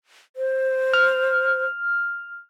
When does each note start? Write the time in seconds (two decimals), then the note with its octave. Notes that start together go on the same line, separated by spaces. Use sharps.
0.36 C5
0.93 F6